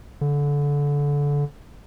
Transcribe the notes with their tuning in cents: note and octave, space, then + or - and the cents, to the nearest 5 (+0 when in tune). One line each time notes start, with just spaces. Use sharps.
D3 -25